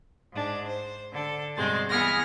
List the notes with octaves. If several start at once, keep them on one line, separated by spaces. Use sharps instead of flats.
G#2 D4
C5
D3 A4
G2 B2 G#3 C4 A6
E3 B3 G#4 F6 A#6